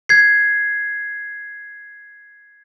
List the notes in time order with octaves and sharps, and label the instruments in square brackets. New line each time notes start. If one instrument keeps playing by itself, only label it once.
[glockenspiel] G#6 C7